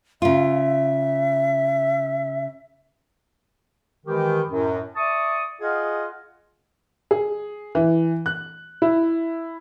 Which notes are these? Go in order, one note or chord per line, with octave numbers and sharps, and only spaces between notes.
C#3 F4 E5
D#3 E3 G#3 G4
F#2 A2
D5 E5 A5 C#6 D#6
F4 G#4 D#5 F#5
G#4
E3
F#6
E4